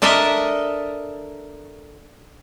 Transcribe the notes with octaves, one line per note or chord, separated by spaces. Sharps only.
D4 A4 A#4 D#5 E5